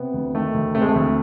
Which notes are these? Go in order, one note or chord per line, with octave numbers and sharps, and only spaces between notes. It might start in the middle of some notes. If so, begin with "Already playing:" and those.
Already playing: C3 B3
D2
D#3 A3
D2
C3 A3
G#3
A3
D2